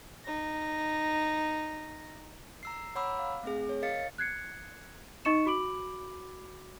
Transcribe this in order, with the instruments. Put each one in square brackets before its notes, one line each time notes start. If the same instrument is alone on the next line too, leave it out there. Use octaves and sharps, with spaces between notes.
[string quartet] D#4 A#6
[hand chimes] A#5 E6 C7
C#5 F#5 A#5 B5 D6 E6
F5
A3 C4 G#4
C#5
A#4 D#5 F5 A6 C#7
[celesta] F#6 G#6 C7 C#7
D#4 D#5 C#6 C#7 E7
F#4 B5 D6 D7 F#7